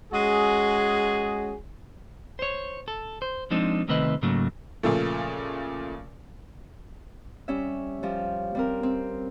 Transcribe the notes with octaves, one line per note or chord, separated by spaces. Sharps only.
G#3 C#4 F#4 G#4
C5 C#5
A4
C5
F3 G#3 C4 D4 D#4
C2 D#3 A3 C4 B4 D#5
G#2 C#3 F#3 A3 A#3
A#2 C#3 F3 A3
G3 C#4 E5
F3 G3
G3 C4 A#4
C4